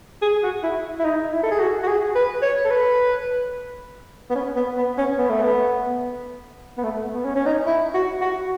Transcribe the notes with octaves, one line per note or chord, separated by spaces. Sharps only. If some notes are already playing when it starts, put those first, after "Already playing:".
G#4
F#4
E4
E4
D#4
E4
A4
G#4
F#4
F#4
G#4
B4
C#5
A4
B4
B3
C#4
B3
B3
C#4
B3
A3
B3
B3
A3
B3
C#4
C#4
D#4
E4
F#4
F#4